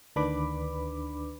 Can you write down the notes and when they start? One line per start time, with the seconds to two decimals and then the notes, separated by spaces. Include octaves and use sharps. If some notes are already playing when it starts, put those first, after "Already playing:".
0.16 D2 D#3 D4 B4 B5 D6